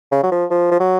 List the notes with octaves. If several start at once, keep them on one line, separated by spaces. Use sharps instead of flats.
C#3
F#3
F3
F3
F3
F#3